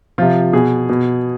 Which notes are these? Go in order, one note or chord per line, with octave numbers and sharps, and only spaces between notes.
C3 F3 F4
B2 G#4
B2